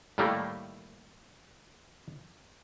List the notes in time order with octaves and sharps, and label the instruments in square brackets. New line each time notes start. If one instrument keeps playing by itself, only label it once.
[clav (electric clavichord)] A2 D#3 G3 A3 A#3